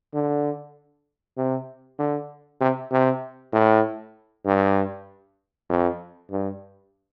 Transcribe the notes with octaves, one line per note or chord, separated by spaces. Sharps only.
D3
C3
D3
C3
C3
A2
G2
F2
G2